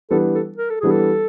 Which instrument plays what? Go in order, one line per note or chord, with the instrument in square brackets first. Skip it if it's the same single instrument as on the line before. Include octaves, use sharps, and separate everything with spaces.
[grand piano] E3 G3 B3 D4 [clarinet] A4
[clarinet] A4
A#4
A4
[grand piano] E3 G3 B3 D4 [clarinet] G#4
[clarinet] A4